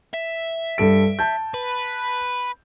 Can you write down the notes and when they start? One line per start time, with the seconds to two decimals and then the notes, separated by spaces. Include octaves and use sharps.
0.13 E5
0.78 G2 A4 D7
1.19 A5 G6
1.54 B4